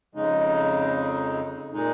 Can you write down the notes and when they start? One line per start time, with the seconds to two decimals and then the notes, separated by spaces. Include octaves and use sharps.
0.15 F2 C#3 G#3 D#4
1.73 A#2 G#3 D#4